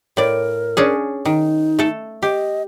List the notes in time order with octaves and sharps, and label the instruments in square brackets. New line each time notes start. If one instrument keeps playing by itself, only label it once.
[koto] A2 D5 [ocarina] A#4
[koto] C#4 D4 G#4
[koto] D#3 [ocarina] D#4
[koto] A3 A4
[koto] G4 [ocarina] D#5